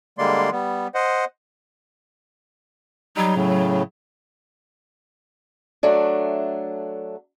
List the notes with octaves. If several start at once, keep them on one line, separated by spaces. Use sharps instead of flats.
D3 G3 G#3 A#3 D5 C6
G3 B3
C5 D#5 F#5
F#3 G3 D#4
A2 C#3
F#3 A3 D4